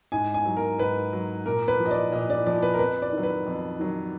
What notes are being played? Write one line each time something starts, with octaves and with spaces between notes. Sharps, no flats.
G#2 G#5
G#5
F#3
A#4
G#2 B4
F#3
A#2 A#4
B4
F3
D#5
D5
A#2 D#5
D5
F3 D5
B4
A#4
F2 B4
D5
D#3 F#3
B4
F2
D#3 F#3